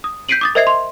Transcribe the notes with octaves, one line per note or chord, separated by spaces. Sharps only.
D#6
G6 B6 C7 D7 D#7 F#7
D6 D#6 A6
A#4 C5 D#5 E5 G#6 C7
C6